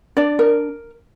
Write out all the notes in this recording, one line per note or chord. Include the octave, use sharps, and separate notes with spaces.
D4 D5
A#4